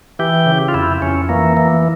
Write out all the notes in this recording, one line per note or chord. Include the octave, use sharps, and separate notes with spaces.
E3 G4
C#3
F4
F2 E4
F2 C#4
E3 A#3
E3